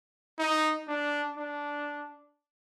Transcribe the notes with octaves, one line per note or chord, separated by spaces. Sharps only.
D#4
D4
D4